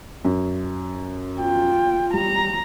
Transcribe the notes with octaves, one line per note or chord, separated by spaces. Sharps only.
F#2
F4 G5
G3 A#5